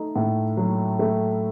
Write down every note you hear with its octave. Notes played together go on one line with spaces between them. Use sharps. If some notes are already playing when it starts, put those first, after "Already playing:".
Already playing: A3 D#4
A2
F#3
A3